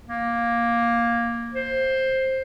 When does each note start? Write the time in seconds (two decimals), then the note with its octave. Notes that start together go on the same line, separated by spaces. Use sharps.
0.08 A#3
1.54 C5